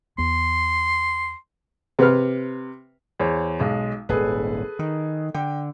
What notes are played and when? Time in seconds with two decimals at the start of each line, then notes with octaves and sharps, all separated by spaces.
0.18 E2 B3 C6
1.99 C3 B4 F6
3.20 E2 C5 C#5
3.60 B1 G#3
4.09 D#1 G#1 G#4 A4 B4
4.79 D#3
5.35 D3 G5